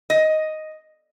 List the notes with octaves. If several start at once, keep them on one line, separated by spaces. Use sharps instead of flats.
D#5